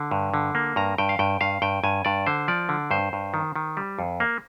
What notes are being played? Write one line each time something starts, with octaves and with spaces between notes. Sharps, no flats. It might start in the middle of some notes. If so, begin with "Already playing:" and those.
Already playing: D3
G2
D3
A#3
G2 A#5
G2 G5
F5
G2 G5
G2 F5
G2 G5
G2 G#5
G2 D5
D3 C5
F3 D5
D3
G2 C5
G2
D#3
D#3
G3
F2
A#3